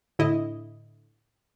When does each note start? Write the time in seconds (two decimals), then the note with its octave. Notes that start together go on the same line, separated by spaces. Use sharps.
0.19 A2 D3 E4 D#5